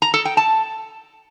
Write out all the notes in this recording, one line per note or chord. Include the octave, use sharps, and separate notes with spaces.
A#5
A4
G5
A5